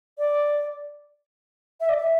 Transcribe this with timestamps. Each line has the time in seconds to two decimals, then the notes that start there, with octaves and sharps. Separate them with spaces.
0.18 D5
1.80 E5
1.89 D5
1.97 E5